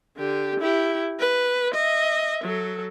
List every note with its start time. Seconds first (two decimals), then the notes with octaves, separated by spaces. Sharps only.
0.18 D3 G4
0.60 E4 G4
1.20 B4
1.74 D#5 E5
2.44 F#3 A4